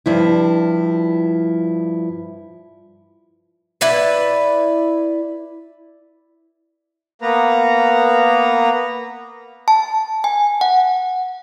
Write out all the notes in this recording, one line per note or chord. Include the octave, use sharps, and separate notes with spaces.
G2 F3 E4
E4 B4 D5
A#3 B3 B4 A#5
A5
G#5
F#5